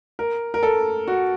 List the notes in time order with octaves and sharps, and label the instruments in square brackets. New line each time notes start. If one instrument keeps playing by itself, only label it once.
[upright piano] A#4
A#4
A4
F#4